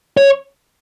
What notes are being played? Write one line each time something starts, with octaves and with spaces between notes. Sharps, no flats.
C#5